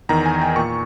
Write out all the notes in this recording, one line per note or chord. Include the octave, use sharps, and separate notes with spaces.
E2 D#3 A#5
G#5
G5
A#2 C#6